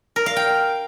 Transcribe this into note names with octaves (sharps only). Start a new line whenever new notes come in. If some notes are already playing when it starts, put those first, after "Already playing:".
A#4
F5
G5